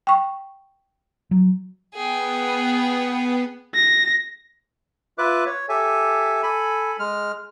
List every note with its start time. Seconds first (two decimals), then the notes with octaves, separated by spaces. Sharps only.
0.07 G5 C#6
1.31 F#3
1.95 B3 G#4 G5
3.75 A#6
5.18 F4 B4 E5 D6 F#6
5.46 C#5
5.69 G4 A4 E5 G#5
6.43 A4 G#5 B5
6.99 G#3 F6